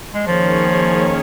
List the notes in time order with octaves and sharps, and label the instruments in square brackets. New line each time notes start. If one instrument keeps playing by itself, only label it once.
[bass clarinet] G#3
[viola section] D#3 A#3 C#4 G#4 C#5 [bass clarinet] F3